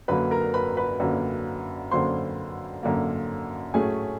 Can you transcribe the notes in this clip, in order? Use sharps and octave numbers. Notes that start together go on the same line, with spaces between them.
F#2 D3 F#3 A#3 B4 B5
A#4 A#5
B4 B5
B4 B5
F#2 D3 F#3 A#3
F#2 D3 F#3 A#3 C5 C6
F#2 D3 F#3 A#3
A2 F#3 A3 C#4 G#4 G#5